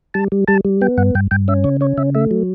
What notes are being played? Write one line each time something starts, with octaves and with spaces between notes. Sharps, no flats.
G3 A5
G3
G3 A5
G3
B3 G5
G2 F#5
G2 G5
G2 G5
C#4 E5
C#3 C#5
C#4 C#5
C#3 E5
A3 E5
F#3